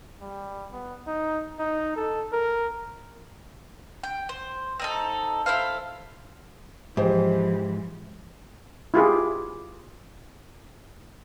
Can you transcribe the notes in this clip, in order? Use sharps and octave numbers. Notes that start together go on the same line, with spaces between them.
G3
B3
D#4
D#4
A4
A#4
G5
C5
C4 D#4 A4
E4 A4 C5 F5
G#2 E3 F3 G4 C5
E4 F4 G4 G#4